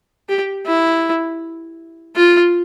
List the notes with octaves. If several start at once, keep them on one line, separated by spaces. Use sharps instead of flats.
G4
E4
F4